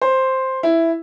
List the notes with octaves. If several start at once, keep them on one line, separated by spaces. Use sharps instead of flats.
C5
E4